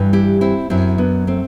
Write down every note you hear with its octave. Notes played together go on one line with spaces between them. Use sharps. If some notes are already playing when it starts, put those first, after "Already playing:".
Already playing: G2 E3 G3
E4 G4
C4 E4
F#2 F#3 C4 E4
B3 D4
A3 C4